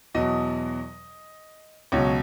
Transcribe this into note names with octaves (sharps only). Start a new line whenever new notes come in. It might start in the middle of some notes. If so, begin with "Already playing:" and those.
E2 B2 F#3 D#5
C#2 B2 F#3 C#5